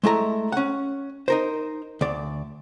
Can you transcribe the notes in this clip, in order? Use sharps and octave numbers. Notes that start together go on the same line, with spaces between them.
G#3 A3 E4 A#5
C#4 F#5
D#4 A#4 C5
D2 D5